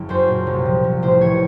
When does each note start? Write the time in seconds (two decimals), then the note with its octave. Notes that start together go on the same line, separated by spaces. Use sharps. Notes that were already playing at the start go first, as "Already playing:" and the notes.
Already playing: F#1
0.09 F#2 C5
0.28 A#2
0.47 C2
0.65 F3
0.84 C2
1.02 A1 C5
1.21 E3 C#5